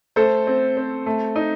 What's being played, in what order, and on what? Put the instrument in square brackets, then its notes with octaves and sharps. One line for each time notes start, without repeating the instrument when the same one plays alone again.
[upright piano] A3 A4 C5
C4
C4
A3
D#4